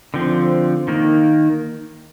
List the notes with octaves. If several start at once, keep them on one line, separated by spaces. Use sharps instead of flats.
D3 F3 C4
D#3 A#3